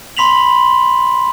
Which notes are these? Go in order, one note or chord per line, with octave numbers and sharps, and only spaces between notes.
B5 C6 B6 F7 F#7